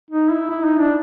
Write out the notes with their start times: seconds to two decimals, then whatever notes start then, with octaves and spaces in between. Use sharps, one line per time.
0.11 D#4
0.31 E4
0.50 E4
0.64 D#4
0.79 D4